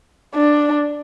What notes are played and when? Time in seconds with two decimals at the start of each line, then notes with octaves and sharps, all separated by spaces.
0.35 D4